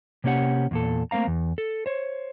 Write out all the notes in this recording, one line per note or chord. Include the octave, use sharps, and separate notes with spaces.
C3 A#3 C#4 G4 F#5
E2 A#2 A4
A3 A#3 C4 F5 A#5
E2
A4
C5 C#5